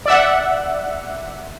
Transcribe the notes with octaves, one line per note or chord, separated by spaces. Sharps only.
D5 E5 F#5